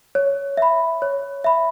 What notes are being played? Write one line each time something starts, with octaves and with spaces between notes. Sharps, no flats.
C#5
E5 B5
C#5
E5 B5